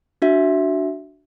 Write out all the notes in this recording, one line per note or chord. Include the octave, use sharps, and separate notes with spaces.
D4 F#4 E5